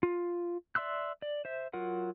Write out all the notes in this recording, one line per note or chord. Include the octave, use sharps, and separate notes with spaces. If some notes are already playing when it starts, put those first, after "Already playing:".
F4
D5 E5 C6 E6 F#6
D5
C5 E5
F#3 F4 A#4 F#5